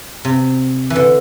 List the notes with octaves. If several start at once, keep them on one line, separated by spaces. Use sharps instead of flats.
C3
E3
D3